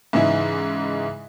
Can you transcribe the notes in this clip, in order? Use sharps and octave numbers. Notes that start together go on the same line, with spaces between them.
G#2 C#3 E3 D#4 E4 G#4